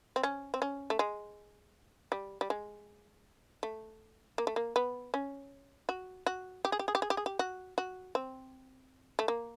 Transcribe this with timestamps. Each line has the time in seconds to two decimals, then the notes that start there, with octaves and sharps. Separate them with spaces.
0.16 C4
0.23 C#4
0.54 C4
0.62 C#4
0.90 A3
0.99 G#3
2.12 G3
2.41 G3
2.50 G#3
3.63 A3
4.38 A#3
4.47 A3
4.56 A#3
4.76 B3
5.14 C#4
5.89 F#4
6.26 F#4
6.65 G4
6.72 G#4
6.79 G4
6.88 G#4
6.95 G4
7.02 G#4
7.10 G4
7.17 G#4
7.26 G4
7.39 F#4
7.78 F#4
8.15 C4
9.19 A3
9.28 A#3